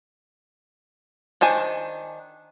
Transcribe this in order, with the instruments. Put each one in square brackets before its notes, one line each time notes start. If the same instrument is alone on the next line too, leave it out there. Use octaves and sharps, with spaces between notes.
[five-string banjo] D#3 D4 C5 G#5